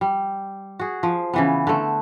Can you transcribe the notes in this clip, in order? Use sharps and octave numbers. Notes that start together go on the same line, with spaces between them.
G3
F#4 G#4
F3
C#3 E3 B3
D3 A3